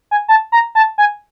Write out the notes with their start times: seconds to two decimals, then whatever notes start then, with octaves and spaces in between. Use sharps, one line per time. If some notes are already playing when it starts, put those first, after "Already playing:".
0.11 G#5
0.28 A5
0.52 A#5
0.75 A5
0.98 G#5